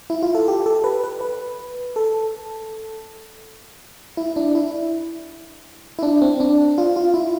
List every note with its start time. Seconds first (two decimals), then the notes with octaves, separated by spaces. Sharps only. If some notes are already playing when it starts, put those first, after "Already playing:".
0.10 E4
0.23 F4
0.35 A4
0.48 G4
0.66 A4
0.84 B4
1.04 B4
1.21 B4
1.96 A4
4.17 E4
4.36 D4
4.55 E4
5.99 E4
6.03 D4
6.22 C4
6.40 D4
6.78 F4
6.96 F4
7.14 E4